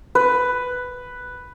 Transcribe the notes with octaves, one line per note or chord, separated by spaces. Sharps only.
B4